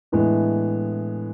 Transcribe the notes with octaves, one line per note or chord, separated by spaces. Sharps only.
A2 E3 G#3 B3 D4